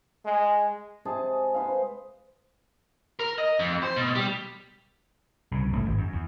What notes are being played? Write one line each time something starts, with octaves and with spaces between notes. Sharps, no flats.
G#3
C3 G#3 G#4 A5
B4 C5 F5
A#4
D#5
F2
C5
B2
G3
C2 C#3
A1 G2
G#1
F#2
E2